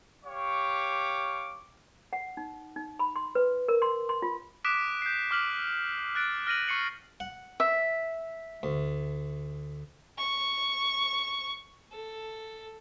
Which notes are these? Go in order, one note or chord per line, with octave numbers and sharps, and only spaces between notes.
G4 C#5 F5 C#6 D6
F#5
D#4
D#4
B5
C6
B4
A#4
C6
C6
F4
D6 D#6 F#6 B6 D7 E7
G6 C7
D6 F6 B6 F#7
F#6 A6 D7
F6 A#6 D#7 F#7
C#6 C7 C#7 F#7
F#5
E5
D2
C#6
A4